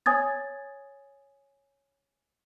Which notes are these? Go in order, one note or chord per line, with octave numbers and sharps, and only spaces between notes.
C#5 G#5 D#6 G#6 A6